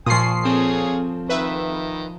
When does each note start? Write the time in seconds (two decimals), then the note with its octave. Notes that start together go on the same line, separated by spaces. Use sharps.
0.06 A#2 F3 G#5 C6 C#6 D#6 C7
0.45 C4 F4 G#4 A4 C#5
1.29 D#3 B4 E5